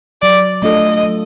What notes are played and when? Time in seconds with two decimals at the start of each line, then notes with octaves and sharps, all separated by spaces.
0.22 F#3 D5
0.62 A3 D4 F4 A4 D#5
1.03 F#3